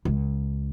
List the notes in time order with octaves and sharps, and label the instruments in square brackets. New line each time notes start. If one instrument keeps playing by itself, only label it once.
[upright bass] C#2